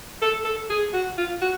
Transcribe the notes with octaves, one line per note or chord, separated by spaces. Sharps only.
A4
A4
G#4
F#4
F4
F#4